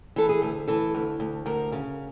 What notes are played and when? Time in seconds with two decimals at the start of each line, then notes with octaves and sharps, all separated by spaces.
0.16 E3 A4
0.29 G#4
0.42 D2
0.68 E3 A4
0.95 D2
1.20 D2
1.46 D2 A#4
1.72 C#3